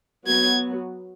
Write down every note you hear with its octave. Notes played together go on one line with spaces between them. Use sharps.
F#3 B3 F#4 G#6